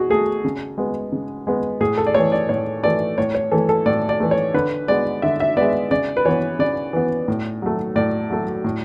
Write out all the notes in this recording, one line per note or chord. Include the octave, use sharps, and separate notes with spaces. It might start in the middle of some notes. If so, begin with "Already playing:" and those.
Already playing: B2 F#4 G#4
A3 G#4
C#3
G#3 B3
C#3
G#3 B3
A2 G#4
A4
D5
E3 A3 C#5
D5
A2 C#5
E3 A3 D5
A2 C#5
C#5
E3 A3 A4
A4
A2 D5
D5
E3 A3
C#5
D3 B4
G#3 B3 D5
D3 E5
E5
G#3 B3 D5
C#3 D5
B4
E3 B3 C#5
C#3 D5
E3 B3
A2
F#3 A3
A2 D5
F#3 A3
A2